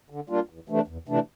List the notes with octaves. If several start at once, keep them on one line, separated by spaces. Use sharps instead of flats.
D3
G3 A#3 D4 F4
E2
C3 E3 A3 D4
E2
C3 E3 A3 D4